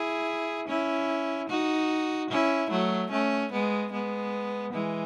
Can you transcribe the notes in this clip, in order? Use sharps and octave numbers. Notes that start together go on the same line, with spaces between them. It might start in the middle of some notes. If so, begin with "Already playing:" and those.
Already playing: E4 G#4
C#4 E4
D#4 F#4
C#4 E4
F#3 A3
A3 C#4
G#3 B3
G#3 B3
E3 G#3